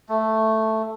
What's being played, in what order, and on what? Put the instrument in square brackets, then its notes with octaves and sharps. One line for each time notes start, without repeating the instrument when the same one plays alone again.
[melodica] A3